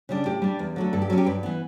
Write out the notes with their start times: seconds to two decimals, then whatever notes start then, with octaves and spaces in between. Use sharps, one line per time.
0.09 C#3 G3 D4
0.26 A2 G4
0.42 G3 D4
0.59 E2
0.76 D3 F#3 A3
0.93 G2 A4
1.02 G4
1.10 F#3 C#4 A4
1.18 G4
1.26 G2 B4
1.43 E3 B3